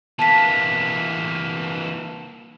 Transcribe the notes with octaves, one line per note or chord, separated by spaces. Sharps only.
E3 A#3 A5 B6